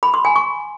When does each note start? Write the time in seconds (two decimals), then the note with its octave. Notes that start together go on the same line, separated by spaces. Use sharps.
0.03 B5
0.14 C6
0.25 G#5
0.36 C#6